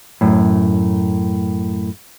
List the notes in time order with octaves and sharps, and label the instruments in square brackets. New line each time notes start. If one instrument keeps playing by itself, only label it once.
[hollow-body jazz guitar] F#2 A2